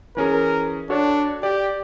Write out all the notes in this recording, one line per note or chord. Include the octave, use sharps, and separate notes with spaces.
E3 C#4 G#4 A#4
D4 F#4 A4 C#5
G4 D5